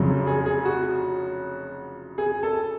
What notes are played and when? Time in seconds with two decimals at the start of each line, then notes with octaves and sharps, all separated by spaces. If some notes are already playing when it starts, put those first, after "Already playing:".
Already playing: F1 F2 C#3 F#3
0.27 G#4
0.46 G#4
0.65 F#4
2.18 G#4
2.43 A4